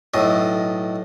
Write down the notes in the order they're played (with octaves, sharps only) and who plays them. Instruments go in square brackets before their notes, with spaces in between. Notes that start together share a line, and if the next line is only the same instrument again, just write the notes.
[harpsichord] B1 A2 D#5